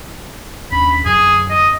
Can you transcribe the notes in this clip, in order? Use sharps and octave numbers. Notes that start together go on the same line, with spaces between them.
D#2 C#4 D4 B5
F#2 D3 G#4
D#5